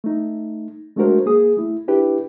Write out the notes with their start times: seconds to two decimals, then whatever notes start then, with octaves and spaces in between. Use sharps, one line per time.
0.04 A3 D#4
0.96 G#3 A3 D4 F#4 A#4 C5
1.26 A#3 G#4 D#6
1.57 A3 E4
1.88 D4 E4 G4 B4